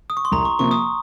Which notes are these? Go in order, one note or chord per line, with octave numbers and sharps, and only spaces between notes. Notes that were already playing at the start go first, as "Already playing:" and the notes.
D#6
C#6
C6
C2 A#5
C#6
C3 F3 A#3 C#6
D#6